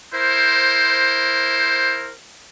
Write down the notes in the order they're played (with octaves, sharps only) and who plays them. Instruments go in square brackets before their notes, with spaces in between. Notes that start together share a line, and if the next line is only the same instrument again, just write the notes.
[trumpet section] E4 A#4 C5